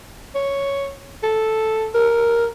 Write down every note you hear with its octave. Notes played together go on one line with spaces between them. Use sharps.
C#5
A4
A#4